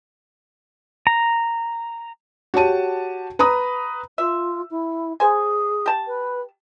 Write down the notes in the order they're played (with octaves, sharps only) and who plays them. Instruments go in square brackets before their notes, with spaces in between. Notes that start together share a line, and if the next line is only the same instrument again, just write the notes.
[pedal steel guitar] A#5
[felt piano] F#4 G4 C#5 A5 D#7
B4 A#5 B5 D#6
[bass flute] F4 [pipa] E5
[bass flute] E4
[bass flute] G#4 [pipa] C5 G#5
[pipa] G4 A5
[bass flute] B4